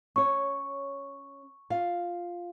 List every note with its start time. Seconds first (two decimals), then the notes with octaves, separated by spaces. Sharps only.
0.16 C#4 C#5 C#6
1.70 F4 F5